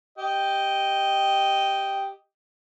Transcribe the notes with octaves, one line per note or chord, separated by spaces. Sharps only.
G4 D#5